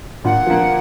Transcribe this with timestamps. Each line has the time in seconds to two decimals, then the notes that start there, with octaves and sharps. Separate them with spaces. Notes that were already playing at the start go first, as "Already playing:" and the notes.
0.25 A#2 F#5
0.46 F3 A#3